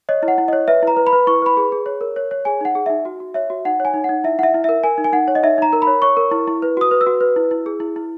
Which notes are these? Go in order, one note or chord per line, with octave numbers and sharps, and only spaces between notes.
C#5 D#5
E4
F#5
E4
C#5 D#5
B4 E5
E4 A#5
B4
B5
B4
E4 C#6
B4 B5
G#4
G#4
C#5
A#4
C#5
C#5
G#4 G#5
D#4 F#5
G#4
D#4 E5
F#4
F#4
C#5 E5
F#4
D#4 F#5
C#5
G#5
D#4
D#4 F#5
E4 E5
E4 E5 F#5
E4
A#4 E5
A#4 G#5
D#4
G#5
D#4 F#5
C#5
D#5
D#4 E5
D#4 A#5
A#4
B5
C#5
C#5 C#6
A#4
E4
E4
B4
F#4 D#6
B4
E6
F#4
B4
E4
E4
G#4
E4
E4